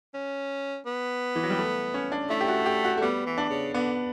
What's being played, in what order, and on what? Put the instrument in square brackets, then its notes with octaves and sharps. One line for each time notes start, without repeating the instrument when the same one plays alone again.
[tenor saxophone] C#4
B3
[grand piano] E3
F#3
G3
A3
C#4
D4
[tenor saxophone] A3 [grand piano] E4
[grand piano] G4
F#4
G4
F#4
A3
[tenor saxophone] G3 [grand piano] B3
[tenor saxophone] E3
[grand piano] D4
[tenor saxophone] C#3
[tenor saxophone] D3 [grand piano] B3